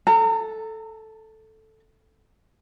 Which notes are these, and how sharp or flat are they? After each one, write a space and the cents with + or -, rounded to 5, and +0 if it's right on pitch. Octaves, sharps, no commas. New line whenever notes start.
A4 +0 A#5 -35